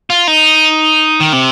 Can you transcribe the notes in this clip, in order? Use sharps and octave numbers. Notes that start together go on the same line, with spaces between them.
F4
D#4
D#3
C3